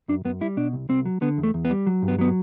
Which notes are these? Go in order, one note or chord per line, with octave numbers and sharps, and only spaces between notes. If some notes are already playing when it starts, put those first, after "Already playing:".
F#2 D4
F#2 B3
G3 E4
B2 D4
C2
C2 C4
F#3
D3 B3
E2
A3
E2
B3
G3
F#3
G2
B3
F#3 B3